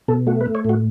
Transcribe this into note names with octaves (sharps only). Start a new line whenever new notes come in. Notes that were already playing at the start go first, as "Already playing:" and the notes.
B2 A4
A3 F#4
B4
A3
C#5
A2 F#4